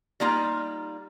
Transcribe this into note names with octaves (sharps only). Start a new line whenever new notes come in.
G3 A#3 D#4 F4